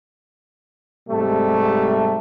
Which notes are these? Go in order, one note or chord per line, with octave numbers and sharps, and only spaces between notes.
G#2 C3 G3 A3